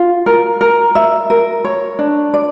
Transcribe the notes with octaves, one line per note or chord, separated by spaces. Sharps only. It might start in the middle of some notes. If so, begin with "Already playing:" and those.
Already playing: F4
A#4
A#4
E5
A#4
C#5
D4
D5